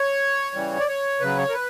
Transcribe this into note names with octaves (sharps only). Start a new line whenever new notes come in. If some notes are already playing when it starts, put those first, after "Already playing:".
Already playing: C#5
C#3 E3 G3
D5
C#5
C#3 F#3 B4
C#5
A#4
B4